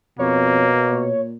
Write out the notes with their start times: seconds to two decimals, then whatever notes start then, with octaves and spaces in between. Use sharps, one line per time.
0.19 F2 B2 A#3 C#5
0.92 A#2